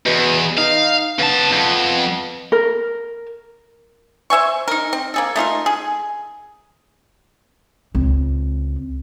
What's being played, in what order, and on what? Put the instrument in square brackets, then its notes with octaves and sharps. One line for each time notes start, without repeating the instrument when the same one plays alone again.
[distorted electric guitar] E2 [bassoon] B2
[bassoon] D#4 [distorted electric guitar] F5
[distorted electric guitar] C#3 A5 [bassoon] B3
[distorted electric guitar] F2
[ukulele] A#4
[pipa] C5 E5 G#5 C#6
D#4 A#4
C4
A#3 G#4 A4
A3 D#4 F4 A#4
G#4
[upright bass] C#2 C4